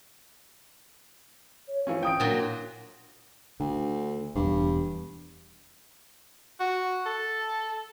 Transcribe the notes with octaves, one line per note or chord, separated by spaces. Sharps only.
C#5
E3 F3 C#4 F5
G5 D#6 D7
A#2 F#3 D4
D2 D3
E1 E2 G2
F#4
A4